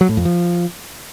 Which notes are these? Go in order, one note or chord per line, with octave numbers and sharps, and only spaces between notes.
F#3
A2
F2
F3